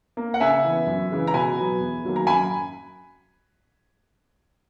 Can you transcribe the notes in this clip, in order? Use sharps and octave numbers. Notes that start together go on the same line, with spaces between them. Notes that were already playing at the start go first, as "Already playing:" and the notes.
A#3
F#5
C#3 E5 G#5
E3 B3
F#2
C#3 E3 G#3
A#5
B2 G#5 B5
F#3 B3
E2
D#3 F#3 A#3
A#5
F#2 G#5 B5